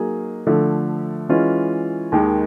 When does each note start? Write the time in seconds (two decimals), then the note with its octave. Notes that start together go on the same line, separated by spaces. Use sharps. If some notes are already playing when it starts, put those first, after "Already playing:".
Already playing: F#3 A#3 D#4 G#4
0.47 D3 F3 A3
1.29 E3 G#3 C#4 F4
2.12 D#2 D#3 G#3